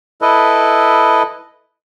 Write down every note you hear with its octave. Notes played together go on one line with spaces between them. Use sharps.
E4 A4 B4 D#5